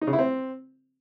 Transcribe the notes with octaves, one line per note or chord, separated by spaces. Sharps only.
D#4
C#3
E4
C4